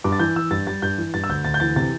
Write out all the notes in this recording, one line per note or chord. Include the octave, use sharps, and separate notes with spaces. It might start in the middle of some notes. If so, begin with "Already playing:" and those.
G2 D6
A6
E3 G6
E3 E6
G2 A6
G3 A6
G2 G6
E3
G2 A6
E6
D2 G6
D2 A6
G6
E3 A6
C3 A6